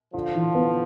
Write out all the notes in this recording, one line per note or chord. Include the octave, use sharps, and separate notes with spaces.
D3 F3 F4
E3
B3